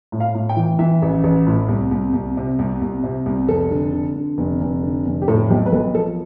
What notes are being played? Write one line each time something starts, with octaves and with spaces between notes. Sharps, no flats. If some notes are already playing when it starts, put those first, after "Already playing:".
A2
F5
A2
G5
E3
E3 E5
A1
A1
A2
C2
C2
C2
C3
C2
C2
C3
C2
F1 A4
D3
D3
D3
F1
F1
D3
F1
G4
A2 A4
B1 G4
B4
B1 A4
F3 A4